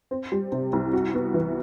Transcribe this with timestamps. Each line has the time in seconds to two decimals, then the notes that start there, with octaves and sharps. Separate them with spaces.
0.11 C4
0.32 G3
0.52 C3
0.73 C2
0.93 F#4
1.14 B3
1.34 E3